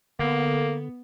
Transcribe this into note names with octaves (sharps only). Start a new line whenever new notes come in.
D3 A#3 B3